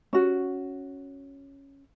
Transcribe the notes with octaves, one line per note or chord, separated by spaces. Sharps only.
C#4 F#4